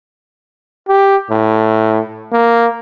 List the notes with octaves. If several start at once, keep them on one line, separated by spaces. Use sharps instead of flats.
G4
A2
A#3